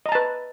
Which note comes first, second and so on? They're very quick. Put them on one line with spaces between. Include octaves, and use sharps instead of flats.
D#5 A#5 A5 B4